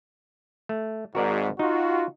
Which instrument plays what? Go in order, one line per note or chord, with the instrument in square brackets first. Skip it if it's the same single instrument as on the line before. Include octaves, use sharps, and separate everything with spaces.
[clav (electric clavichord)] A3
[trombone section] G#1 G#2 [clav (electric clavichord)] F#4 A#4 D5
[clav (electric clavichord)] D#4 [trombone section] F4 F#4